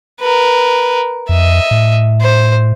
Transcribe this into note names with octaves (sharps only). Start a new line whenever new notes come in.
A#4 B4
F2 D#5 E5
A2
C5